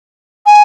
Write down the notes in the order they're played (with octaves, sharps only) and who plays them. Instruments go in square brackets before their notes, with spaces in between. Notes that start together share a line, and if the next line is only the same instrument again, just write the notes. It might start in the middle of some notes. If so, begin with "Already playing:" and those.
[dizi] G#5